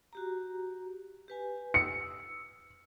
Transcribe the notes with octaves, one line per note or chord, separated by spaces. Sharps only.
F#4 G4 A#5
G4 B4 G#5
D#6 E6 C#7